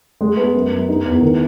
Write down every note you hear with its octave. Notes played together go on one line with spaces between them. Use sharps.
G#3
B3
F#2
F#2
D#4
E2
D#3